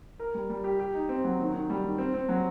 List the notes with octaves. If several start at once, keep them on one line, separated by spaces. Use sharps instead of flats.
A#4
G3
G3
G4
G4
D#4
C4
F#3
D#3
D#3
G3
D#3
C4
C4
F#3